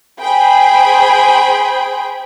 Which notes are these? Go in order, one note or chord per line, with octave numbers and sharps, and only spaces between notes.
G#4 C5 G5 B5